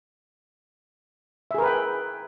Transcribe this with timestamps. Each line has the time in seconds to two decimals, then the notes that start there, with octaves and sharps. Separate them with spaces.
1.51 E5
1.54 G#4
1.58 A#4
1.62 B4
1.66 G5